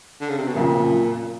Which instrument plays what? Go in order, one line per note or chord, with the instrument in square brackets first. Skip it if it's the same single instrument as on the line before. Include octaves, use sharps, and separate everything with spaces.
[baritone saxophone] D3
C#3
C3
B2
[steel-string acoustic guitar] F2 C#3 F#3 [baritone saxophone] A#2